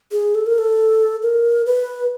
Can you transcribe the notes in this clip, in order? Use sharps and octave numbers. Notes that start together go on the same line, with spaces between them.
G#4
A4
A#4
A4
A#4
B4